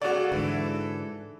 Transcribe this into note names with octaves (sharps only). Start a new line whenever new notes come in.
C#3 F#4 A4 D5
G#2 D3 E3